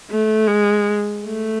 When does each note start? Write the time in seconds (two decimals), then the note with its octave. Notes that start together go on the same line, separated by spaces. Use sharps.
0.10 A3
0.48 G#3
1.27 A3